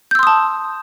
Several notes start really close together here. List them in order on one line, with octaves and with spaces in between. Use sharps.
G6 E6 C6 D#6 A5